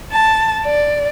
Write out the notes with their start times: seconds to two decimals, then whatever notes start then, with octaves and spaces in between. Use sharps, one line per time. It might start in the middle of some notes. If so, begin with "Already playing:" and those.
0.11 A5
0.63 D5